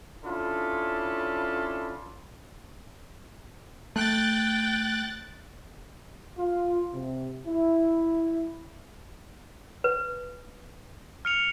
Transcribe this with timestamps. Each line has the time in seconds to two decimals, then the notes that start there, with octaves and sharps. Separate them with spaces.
0.24 C#4 D4 E4 F4 A4 B5
3.96 A3 G5 F#6 A6
6.38 F4
6.93 C3
7.46 E4
9.84 B4
11.25 F6 C#7 F7